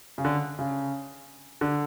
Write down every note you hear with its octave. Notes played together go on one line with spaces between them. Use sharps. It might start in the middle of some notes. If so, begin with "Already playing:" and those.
C#3
D3
C#3
D3